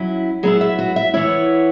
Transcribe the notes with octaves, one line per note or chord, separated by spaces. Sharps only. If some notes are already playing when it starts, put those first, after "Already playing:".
Already playing: F#3 C#4 E4
F#3 B3 E4 G#4
E5
F#4
E5
E3 B3 E4 C#5